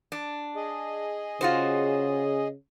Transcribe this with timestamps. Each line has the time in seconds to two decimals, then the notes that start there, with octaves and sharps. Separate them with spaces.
0.12 D4
0.56 G#4 D#5
1.41 C#3 F4 F#4 C5